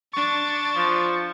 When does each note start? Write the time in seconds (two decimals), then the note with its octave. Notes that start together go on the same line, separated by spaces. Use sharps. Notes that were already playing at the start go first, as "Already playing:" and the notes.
0.13 D4 C#6 A6
0.76 F3